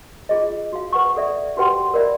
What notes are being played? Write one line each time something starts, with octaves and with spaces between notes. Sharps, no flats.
F4 G#4 D#5
F#4 F5
B4 F#5 C#6
A4 D5 E5
F#4 G4 B4 F#5 G5 C6
A#4 D5 E5 B5